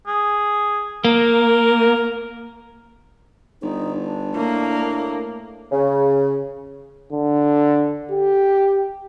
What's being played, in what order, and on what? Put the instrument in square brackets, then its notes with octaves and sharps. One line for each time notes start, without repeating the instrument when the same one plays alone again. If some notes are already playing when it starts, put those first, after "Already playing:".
[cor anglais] G#4
[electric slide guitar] A#3 [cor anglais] A#4
[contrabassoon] G1 [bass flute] D#4
[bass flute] D4
[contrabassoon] A2 [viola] A#3
[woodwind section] C#3
[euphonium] D3
G4